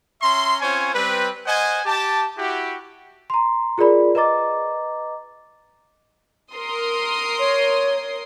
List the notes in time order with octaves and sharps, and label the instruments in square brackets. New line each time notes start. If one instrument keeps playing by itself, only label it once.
[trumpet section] C#4 E5 A#5 C6
C4 C#4 F4 C5 C#5 G#5
G3 C4 B4
C5 D#5 F#5 G#5
G4 A5
E4 F#4 G4
[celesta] A#5 C6
F4 G#4 A#4 D5 B5
B4 D#5 A#5 D6 A6
[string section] A#4 C6 D#6
[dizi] C#5